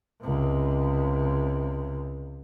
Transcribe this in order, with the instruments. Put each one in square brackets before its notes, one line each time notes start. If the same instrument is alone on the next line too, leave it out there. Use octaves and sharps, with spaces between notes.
[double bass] C#2 C3